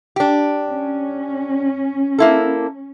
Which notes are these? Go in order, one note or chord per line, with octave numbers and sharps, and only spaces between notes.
D4 G4
C#4
A#3 E4 A4